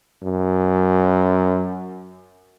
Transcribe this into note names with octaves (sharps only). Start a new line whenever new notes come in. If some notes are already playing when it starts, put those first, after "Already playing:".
F#2